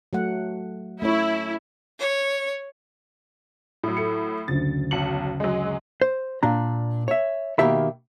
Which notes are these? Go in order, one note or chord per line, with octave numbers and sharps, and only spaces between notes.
F#3 A3 F#5
A3 C#4 E4 C#5
C#5
A2 F#3
A4 C#7
F#1 D2 A6
B1 C#7 F#7
F#3 G#3
C5
A#2 D4 A#5
C#5 E5
B2 D#3 A#3 G4 E5 B5